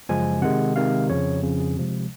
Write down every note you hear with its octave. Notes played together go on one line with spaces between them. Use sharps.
F#2 C#3 F3 G#3 G#5
C3 D#3 G#3 F#5
C3 D#3 G#3 F5
F2 C#3 F3 C#5
F2 C#3 F3
G#4
C3 F3 G#3